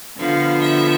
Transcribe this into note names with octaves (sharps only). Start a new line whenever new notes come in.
D3 F3 B3 F5
E5